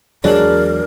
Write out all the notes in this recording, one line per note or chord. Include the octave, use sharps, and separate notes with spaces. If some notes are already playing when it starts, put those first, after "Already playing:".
E2 F#3 G#3 D4 G#4 A#4 C#5 F#7